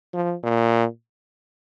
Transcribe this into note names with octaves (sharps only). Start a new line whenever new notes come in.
F3
A#2